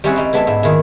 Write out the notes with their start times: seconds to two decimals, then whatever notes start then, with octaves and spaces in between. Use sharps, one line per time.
0.04 G3 C4 C#4 E4 G#4 F#5
0.16 G3 D#4 E4
0.33 G#3 B3 D4 E4 A4 E5
0.47 G#2 E4
0.63 A#2 D#3 E4 G#4